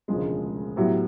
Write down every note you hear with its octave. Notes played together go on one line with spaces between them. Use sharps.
E1 D2 C#3 F3 G#3
A2 F#3 B3 E4 G4